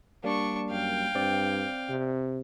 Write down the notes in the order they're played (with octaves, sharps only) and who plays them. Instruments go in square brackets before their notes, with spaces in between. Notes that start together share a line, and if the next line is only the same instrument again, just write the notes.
[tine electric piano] G3 A#3 [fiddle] D4 C#6
[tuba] F#2 [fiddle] F5 G5
[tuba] G2 [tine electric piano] C4 D5
[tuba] C3